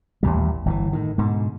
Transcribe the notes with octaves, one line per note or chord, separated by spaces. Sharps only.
A1 D#2 A#2 G3
G1 A#2 E3
A2 D#3
G#2 B2 D3